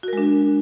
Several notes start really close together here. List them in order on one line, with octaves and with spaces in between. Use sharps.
F#4 A#4 G#3 D4